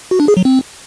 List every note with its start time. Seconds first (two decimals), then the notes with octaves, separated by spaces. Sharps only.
0.11 F#4
0.20 D4
0.28 G#4
0.37 F#3
0.45 C4